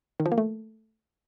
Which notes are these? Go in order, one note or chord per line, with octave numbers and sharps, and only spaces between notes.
D#3
F3
A#3
A3